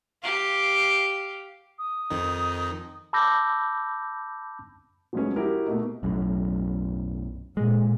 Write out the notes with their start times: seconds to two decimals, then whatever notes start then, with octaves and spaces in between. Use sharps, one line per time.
0.23 G4 F5
1.79 D#6
2.10 F2 D#3 D#4
3.13 A5 B5 D6 E6 G6 A#6
5.13 F3 F#3 G#3 A3 B3 C#4
5.36 E4 F#4 G4 A#4
5.67 B2 A3 A#3 D#4
6.03 B1 F#2 A2
7.57 A#2 G#3